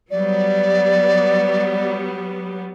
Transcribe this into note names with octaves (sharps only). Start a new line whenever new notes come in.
F#3 G3 B3 D5